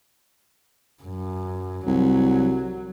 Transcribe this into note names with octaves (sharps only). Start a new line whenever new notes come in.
F#2
C2 F#3